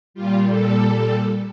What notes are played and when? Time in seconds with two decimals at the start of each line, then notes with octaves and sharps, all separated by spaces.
0.14 A#2 G3 F4
0.47 A4